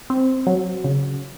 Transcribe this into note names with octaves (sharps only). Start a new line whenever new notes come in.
C4
F#3
C#3